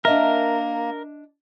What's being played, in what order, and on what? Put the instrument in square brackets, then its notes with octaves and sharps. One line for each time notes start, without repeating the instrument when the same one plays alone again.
[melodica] A#3 [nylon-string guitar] D4 D#5 E5 [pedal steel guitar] A#4